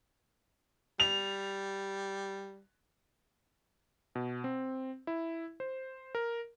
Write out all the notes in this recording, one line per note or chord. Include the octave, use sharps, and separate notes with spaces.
G3 F7
B2
C4
E4
C5
A#4